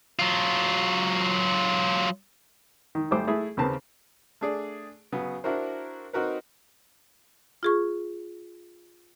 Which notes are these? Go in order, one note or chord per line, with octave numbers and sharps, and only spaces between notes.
F#3 F4
D#3
G#1 G3 A3 C5 D6
A3 E4 G#4
D#2 C#3 A#3 C4 B4 A5
A3 D4 G#4 D5
C#3 F#3 B3
D4 E4 F#4 A#4 C5
C4 D#4 F#4 A#4 B4
F4 G#4 C#6